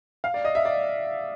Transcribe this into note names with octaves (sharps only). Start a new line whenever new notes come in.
F5
D5
D#5
E5
D5